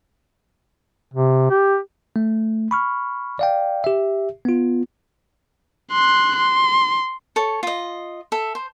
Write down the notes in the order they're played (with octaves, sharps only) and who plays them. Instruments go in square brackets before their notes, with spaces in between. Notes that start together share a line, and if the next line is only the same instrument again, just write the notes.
[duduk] C3
G4
[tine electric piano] A3
B5 C#6 F6
D5 F5 G5
G4 E5
B3 F4
[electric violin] C6 F#6
C6
[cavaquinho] A4 C#5 A5
F4 D#5
A4 E5
C5